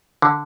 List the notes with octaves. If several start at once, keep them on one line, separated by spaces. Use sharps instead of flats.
D3